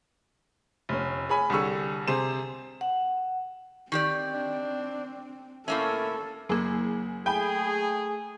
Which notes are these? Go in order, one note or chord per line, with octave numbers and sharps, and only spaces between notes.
F1 C#4
G#4 C#5 G#5 B5
C2 D3 G3 G#4 C#6 E6
C3 G#4 C5 C6 E7
F#5
D#3 C4 G4 D5
D4
A2 A#3 C#4 A4 E5
F#1 F#3 A#3 G#4
A3 G#4 G5 G#5 B5